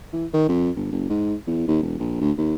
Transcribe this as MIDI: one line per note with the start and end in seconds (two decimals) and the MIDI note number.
0.13 0.26 52
0.33 0.48 51
0.49 0.70 41
0.76 0.92 31
0.92 1.05 30
1.09 1.34 44
1.47 1.67 40
1.68 1.79 39
1.83 1.98 28
1.99 2.17 34
2.21 2.32 38
2.38 2.56 39